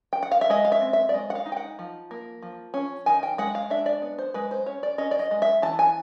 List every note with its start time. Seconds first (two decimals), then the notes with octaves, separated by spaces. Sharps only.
0.13 G5
0.23 F#5
0.32 F5
0.41 E5
0.50 G#3 D#5
0.65 F5
0.72 E5
0.82 C4
0.93 E5
1.09 D5
1.14 G#3 D#5
1.30 F#5
1.35 F5
1.46 D#4
1.52 G5
1.57 F#5
1.79 F3
2.11 A#3
2.43 F3
2.74 C#4
3.06 D#3 G#5
3.23 G5
3.38 G#3 F#5
3.55 F5
3.70 D4 E5
3.86 D5
4.02 B3
4.19 C5
4.34 G#3 B4
4.51 C5
4.66 C#4 C#5
4.83 D5
4.98 C#4 D#5
5.11 D5
5.19 D#5
5.31 G#3
5.42 E5
5.62 E3 A5
5.79 G#5